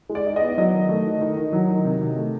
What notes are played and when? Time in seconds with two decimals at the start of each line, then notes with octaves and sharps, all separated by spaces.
0.09 G#3
0.15 D5
0.27 D#4
0.36 D#5
0.42 B3
0.58 F#3 D#5
0.73 D#3
0.89 A3
1.05 D#3
1.21 D#3
1.37 D#3
1.53 F#3
1.69 D#3
1.85 C3
2.01 C3
2.17 A3